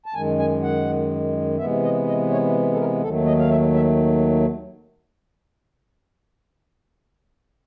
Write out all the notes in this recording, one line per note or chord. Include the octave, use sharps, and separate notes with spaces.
A5
F#2 D#3 G#3 G#5
G#5
F#5
C3 E3 G#3 B3 E5
D#5
D#5
C#5
A4
A#4
D#2 D#3 F#3 A3 A4
D#5
F5
E5
E5